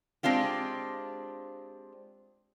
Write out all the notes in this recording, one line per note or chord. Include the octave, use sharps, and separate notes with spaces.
G#3 C4 D4 F4 G4